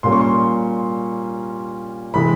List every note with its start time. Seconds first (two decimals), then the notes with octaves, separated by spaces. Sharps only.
0.03 A#2 G3 A#3 C#4 C6
0.12 C#6
0.21 C6
2.14 C3 E3 G#3 B5